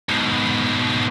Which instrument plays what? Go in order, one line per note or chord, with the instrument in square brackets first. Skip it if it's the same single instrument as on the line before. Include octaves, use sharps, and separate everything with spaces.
[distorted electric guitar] G#2 B2